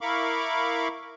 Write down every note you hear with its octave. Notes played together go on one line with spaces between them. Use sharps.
E4 A#4 F5 B5 C#6 D6